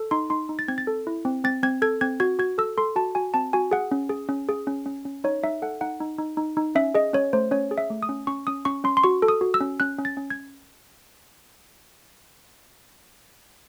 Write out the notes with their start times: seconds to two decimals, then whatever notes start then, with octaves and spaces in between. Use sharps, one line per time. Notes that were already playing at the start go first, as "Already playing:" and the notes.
Already playing: A4
0.11 D#4 C6
0.30 D#4 C6
0.49 D#4
0.59 A6
0.68 C4 G#6
0.78 A6
0.87 A4
1.07 E4
1.25 C4
1.44 C4 A6
1.63 C4 G#6
1.82 A4 G#6
2.01 C4 G#6
2.20 F#4 G#6
2.39 F#4 G#6
2.58 A4 E6
2.78 A4 C6
2.96 F#4 A5
3.15 F#4 G#5
3.34 C4 A5
3.53 F#4 G#5
3.71 G#4 F#5
3.92 C#4
4.09 G#4
4.29 C#4
4.49 G#4
4.67 C#4
4.86 C#4
5.05 C#4
5.24 D#4 C#5
5.44 D#4 E5
5.62 A4 F#5
5.81 D#4 F#5
6.01 D#4
6.18 D#4
6.37 D#4
6.57 D#4
6.75 C#4 E5
6.95 G#4 D#5
7.13 C#4 C#5
7.33 A3 C5
7.51 C#4 C#5
7.71 G#4
7.78 E5
7.90 A3
8.03 D#6
8.09 C#4
8.27 C#4 C#6
8.47 C#4 D#6
8.65 C#4 C#6
8.84 C#4 C6
8.97 C6
9.04 F#4 C#6
9.22 A4
9.28 D#6
9.41 F#4
9.54 E6
9.61 C#4
9.80 C#4 F#6
9.98 C#4
10.05 A6
10.17 C#4
10.30 G#6